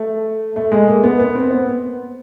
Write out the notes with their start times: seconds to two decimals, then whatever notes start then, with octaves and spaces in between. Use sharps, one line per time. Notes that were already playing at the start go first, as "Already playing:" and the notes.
Already playing: A3
0.56 A3
0.72 G#3
0.88 A#3
1.04 B3
1.19 B3
1.35 C4
1.51 B3